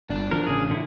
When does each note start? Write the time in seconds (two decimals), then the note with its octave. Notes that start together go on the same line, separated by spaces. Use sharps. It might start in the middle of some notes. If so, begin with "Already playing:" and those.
0.10 G1 D4
0.31 D3 E3 F3 A#4
0.47 A1 C#3 C#4 G#4
0.71 D3 E4